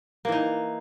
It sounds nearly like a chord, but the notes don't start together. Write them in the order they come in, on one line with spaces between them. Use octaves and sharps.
A#3 E3 D#4